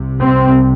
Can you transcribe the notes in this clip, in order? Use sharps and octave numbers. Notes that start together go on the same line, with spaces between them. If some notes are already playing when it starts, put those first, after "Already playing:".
Already playing: C2 C3
C4